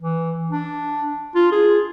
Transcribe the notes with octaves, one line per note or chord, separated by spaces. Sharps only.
E3
D4
F4
G#4